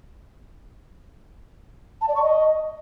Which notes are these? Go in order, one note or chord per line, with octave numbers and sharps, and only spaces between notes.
A5
D5
C#6
D#5